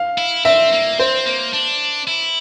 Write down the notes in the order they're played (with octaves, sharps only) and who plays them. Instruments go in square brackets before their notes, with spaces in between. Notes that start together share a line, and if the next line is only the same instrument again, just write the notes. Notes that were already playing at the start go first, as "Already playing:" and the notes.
Already playing: [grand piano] F5
[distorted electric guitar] E4
[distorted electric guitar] C4 [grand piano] E5
[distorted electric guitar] A#3
[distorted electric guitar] C4 [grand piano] C5
[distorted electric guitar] A#3
D4
E4